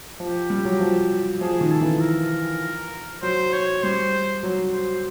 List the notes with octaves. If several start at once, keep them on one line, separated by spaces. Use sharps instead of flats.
F3 G4
G3
F#3
F3
F3 G#4
D#3
A4
E3
A#4
F#3 C5
C#5
G3 C5
F#3
C5